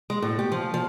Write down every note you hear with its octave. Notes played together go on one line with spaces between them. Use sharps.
G#3
A2
G4
F3
F3